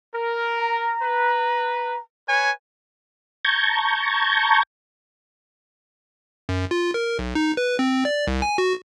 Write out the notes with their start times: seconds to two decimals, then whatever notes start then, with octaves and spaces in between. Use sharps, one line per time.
0.14 A#4
0.58 A#5
1.03 B4
2.28 B4 C#5 G#5
3.45 A5 A#5 C#6 G6 G#6
6.49 F#2
6.71 F4
6.94 A#4
7.19 B1
7.35 D#4
7.57 B4
7.79 C4
8.05 D5
8.27 C2
8.42 G#5
8.58 F#4